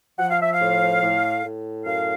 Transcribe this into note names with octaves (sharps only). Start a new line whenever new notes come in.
F3 F#5
F5
E5
F5
A2
A2
A2
F#2 F5